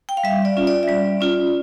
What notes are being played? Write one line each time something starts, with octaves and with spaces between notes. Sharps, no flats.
G5
F5
G3 E5
D5
C#4 F4
D5
E5
G3 D5
C#4 F4